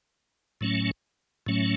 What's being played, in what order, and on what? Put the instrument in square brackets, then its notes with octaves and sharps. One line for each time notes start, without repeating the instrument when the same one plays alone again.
[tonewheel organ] A2 F#3 A3 C#4
A2 F#3 A3 C#4